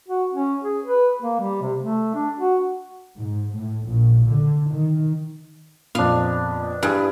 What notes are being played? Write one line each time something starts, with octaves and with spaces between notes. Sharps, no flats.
F#4
C#4
G#4
B4
A#3
G3
C3
A3
D4
F#4
G#2
A2
A#1
D3
D#3
F2 A#2 B3 D4 F5
G2 E4 G#4 B4